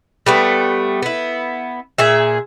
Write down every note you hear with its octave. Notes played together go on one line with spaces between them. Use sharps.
G3 A3 B3
B3 E4
A#2 G#4 E5